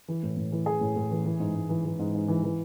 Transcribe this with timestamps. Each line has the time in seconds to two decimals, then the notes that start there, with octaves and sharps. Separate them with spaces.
0.08 E3
0.23 A2
0.37 A2
0.52 E3
0.66 E3 G#4
0.81 A2
0.96 A2
1.11 E3
1.25 E3
1.40 G#2
1.55 G#2
1.69 E3
1.85 E3
1.99 G#2
2.15 G#2
2.28 E3
2.43 E3